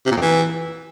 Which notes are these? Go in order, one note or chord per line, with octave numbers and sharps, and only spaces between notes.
C3
A#2
F2
E3